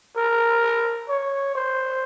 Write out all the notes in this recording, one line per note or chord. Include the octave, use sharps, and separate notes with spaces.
A#4
C#5
C5